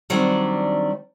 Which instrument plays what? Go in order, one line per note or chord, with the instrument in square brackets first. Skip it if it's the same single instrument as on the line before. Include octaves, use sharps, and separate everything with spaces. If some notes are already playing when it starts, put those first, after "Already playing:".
[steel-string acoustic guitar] D#3 F#3 G3 C4 D4